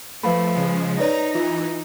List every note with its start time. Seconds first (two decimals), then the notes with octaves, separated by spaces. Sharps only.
0.23 F3 A3 B4 F5 B5
0.55 C#3 G#3
1.00 D#4 B4 C#5 D5 A#5
1.35 E3 F4